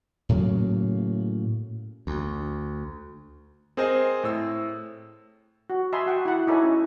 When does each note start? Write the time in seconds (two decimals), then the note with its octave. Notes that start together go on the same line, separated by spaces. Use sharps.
0.29 A2 C#3 F#3 A#3
2.07 D2
3.77 C4 G#4 A#4 C5 D#5 G#5
4.24 A2 E6
5.70 F#4
5.93 D#5 E5 G#5 A5 B5 C6
6.06 F#4 F#5 G5
6.25 E4 F#5
6.47 D#4 E4 A4 C#5 G#5
6.64 C#4